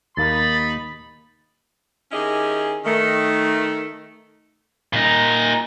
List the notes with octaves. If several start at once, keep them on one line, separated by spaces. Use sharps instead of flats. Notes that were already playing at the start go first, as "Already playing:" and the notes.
D#2 A#3 D#4 A#4 B5 A6
D#3 C#4 E4 G4 G#4 D#5
D#3 A3
A#2 D#4